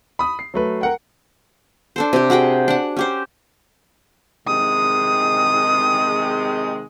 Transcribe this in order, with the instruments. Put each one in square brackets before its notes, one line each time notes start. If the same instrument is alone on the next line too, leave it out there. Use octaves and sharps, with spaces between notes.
[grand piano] B5 D#6
C7
F#3 A3 B4
A#4 F#5 G5
[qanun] D4 A4 C5
C3 G4
F#4 G#4 F#5 G5
D4 F#5
C#4 G4 C5
[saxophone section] C3 D#3 G#3 [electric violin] D#6